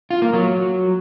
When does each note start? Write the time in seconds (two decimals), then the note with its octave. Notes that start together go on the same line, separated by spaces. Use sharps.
0.11 F4
0.22 A#3
0.33 F#3